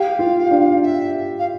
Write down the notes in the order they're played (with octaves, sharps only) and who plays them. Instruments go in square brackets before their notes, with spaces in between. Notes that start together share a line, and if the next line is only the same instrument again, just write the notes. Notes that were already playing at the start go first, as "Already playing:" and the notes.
Already playing: [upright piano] G4 [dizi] F5
[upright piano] F4
D4
[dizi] E5
F5